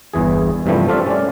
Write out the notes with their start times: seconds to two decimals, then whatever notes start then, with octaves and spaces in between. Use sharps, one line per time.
0.14 G1 E2 E3 G#4
0.66 G2 C3 E3 F3 G3 A3
0.88 A3 C4 F4 D5 E5 F5
1.06 C#4 D5